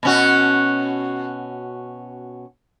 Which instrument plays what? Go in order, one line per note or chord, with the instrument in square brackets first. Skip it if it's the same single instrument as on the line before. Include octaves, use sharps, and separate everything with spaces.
[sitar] B2 C#4 F#4